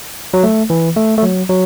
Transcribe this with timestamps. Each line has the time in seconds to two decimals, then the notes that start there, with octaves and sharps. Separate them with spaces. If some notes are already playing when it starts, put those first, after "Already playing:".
0.34 F#3
0.44 A3
0.70 E3
0.96 A3
1.18 A3
1.23 F#3
1.49 F#3